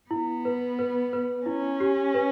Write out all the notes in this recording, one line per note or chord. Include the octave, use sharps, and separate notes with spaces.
B3 E4
B4
B4
B4
C#4 E4
G4
B4